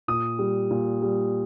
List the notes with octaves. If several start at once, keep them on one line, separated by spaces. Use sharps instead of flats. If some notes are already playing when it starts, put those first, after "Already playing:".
A#2 D#6
G3
A#2
G3